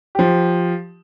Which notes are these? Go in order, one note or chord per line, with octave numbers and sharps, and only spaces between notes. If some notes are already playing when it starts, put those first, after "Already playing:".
F3 G4